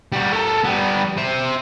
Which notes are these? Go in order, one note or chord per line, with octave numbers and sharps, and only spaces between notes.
G3 F#4
A4 A#4
G3 B3
C5 E5